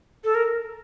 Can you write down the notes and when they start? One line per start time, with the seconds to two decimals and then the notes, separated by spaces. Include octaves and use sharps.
0.24 A4
0.35 A#4